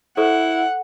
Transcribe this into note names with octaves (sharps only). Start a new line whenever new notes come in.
E4 A4 C5 F#5 C#6